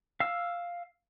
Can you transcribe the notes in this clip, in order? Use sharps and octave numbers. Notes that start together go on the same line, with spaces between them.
F5 E6